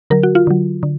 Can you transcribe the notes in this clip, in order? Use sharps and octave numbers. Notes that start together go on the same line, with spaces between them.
D3 F#3 A#4
F#4
F4
D3 F#3
D3